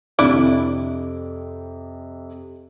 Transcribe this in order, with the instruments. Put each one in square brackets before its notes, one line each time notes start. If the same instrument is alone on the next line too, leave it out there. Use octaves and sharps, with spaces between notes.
[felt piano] F2 C3 [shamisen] D4 E4 D5